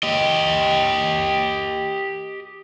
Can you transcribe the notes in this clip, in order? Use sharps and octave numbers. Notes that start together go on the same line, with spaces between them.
G4 D#5